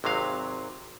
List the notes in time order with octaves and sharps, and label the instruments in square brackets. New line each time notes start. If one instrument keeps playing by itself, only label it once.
[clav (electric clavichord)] G#1 C3 F#3 F5